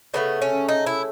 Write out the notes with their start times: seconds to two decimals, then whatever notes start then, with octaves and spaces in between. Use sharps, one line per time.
0.14 C#3 F#3 A3 B3
0.42 C#4
0.68 D#4
0.87 E4